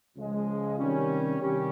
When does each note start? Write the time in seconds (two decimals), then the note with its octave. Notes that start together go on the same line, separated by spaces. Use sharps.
0.17 C#2 C#3 F3 G#3
0.78 C3 D#3 G3 C#4
1.40 C3 D#3 G3 C#4 G4